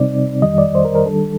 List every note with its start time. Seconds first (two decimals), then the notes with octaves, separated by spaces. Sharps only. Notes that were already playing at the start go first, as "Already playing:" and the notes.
Already playing: C3 G3 C4 D#4 D5
0.42 F2 D#3 G3 D#5
0.58 D5
0.75 C5
0.85 A#4
0.95 A#4
1.06 D#3 G3 D4 A4